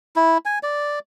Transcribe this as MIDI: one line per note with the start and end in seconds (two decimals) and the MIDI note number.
0.16 0.38 64
0.45 0.59 80
0.63 0.99 74